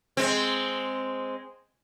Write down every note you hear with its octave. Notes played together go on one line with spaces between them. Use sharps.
G#3 C4